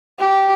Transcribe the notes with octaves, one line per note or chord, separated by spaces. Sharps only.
G4